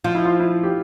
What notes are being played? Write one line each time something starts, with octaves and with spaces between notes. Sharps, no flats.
F3 F4
E4
F4
E4
G4